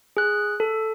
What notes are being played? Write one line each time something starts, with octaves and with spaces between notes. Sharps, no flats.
G#4 F#6
A4